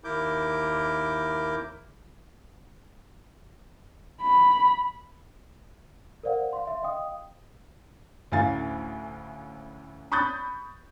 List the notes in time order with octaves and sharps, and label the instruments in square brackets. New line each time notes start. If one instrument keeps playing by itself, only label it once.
[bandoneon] D#2 E4 A#4 D6 G6
[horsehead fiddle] B5
[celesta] A#4 C5 D5 F5 F#5
F5 C6
E5 C6
D#5 F5 G5 D#6
[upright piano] D2 A2 C#4 F5 G#5 A6
B5 C#6 D#6 F#6 G6 A6